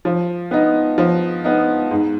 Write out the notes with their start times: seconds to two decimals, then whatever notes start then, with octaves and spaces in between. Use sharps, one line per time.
0.05 F3
0.51 B3 D#4
0.98 F3
1.44 B3 D#4
1.91 G#2